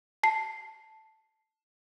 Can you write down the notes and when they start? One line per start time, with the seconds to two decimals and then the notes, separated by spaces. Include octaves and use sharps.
0.23 A5 C7